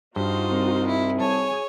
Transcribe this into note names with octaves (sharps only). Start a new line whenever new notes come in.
G2 D#4 F4 F#4 C5
C2
E4
G#4 C#5 G#5 A5